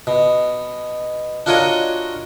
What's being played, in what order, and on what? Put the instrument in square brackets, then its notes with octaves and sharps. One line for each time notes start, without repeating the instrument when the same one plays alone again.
[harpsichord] B2
D4 F4 F#4 A#4 C#5 D#5